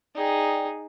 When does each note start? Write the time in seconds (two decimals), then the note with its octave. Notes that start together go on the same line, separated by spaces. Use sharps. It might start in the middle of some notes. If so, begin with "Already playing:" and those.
0.15 D#4 G#4 D5 G5